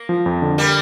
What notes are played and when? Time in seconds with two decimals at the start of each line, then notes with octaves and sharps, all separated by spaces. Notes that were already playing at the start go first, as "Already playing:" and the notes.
Already playing: A#3
0.09 F3
0.26 F2
0.42 D3
0.58 G3 A#3